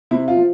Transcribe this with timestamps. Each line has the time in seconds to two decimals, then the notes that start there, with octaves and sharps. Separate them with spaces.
0.11 C3 E4
0.28 F4
0.37 F3